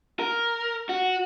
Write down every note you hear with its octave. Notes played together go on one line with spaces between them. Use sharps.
A#4
F#4